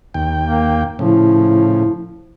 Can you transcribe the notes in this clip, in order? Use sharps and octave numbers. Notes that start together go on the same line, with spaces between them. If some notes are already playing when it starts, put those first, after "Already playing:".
D#2 G5
A#3
A2 C#3 F3 E4